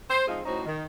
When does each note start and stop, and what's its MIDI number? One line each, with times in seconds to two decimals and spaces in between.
0.10 0.24 72
0.28 0.40 53
0.28 0.40 56
0.28 0.40 60
0.28 0.40 63
0.28 0.40 68
0.28 0.40 77
0.45 0.61 45
0.45 0.61 61
0.45 0.61 63
0.45 0.61 66
0.45 0.61 72
0.66 0.86 51